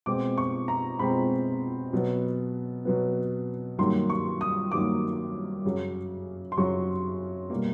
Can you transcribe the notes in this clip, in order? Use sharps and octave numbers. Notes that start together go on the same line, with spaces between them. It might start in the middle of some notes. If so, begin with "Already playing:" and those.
B2 G#3 C4 D6
C#6
A#5
B2 G#3 C4 B5
B2 F#3 B3
B2 F#3 B3
G2 D#3 F#3 A#3 C6
C#6
D#6
G2 D#3 F#3 A#3 D6
F#2 C#3 F#3
C6
F#2 C#3 F#3 C#6
B2 G3 A#3